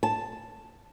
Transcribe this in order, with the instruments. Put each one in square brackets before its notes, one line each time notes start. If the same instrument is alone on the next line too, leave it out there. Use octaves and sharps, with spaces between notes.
[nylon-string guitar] A5